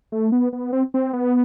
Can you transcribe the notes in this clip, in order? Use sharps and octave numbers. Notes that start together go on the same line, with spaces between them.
A3
B3
B3
C4
C4
B3